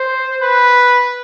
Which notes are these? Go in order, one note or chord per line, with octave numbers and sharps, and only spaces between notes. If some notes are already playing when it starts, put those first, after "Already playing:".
Already playing: C5
B4